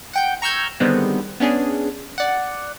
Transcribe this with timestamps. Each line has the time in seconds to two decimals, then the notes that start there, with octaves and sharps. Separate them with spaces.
0.13 F#5 G5 G6
0.42 A#5 C#6 E6 F6 G6 G#6
0.80 D3 D#3 G3 G#3 B3 C4
1.40 B3 C#4 D4 G#4
2.18 D5 F#5